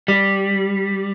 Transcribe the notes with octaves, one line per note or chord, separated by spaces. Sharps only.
G3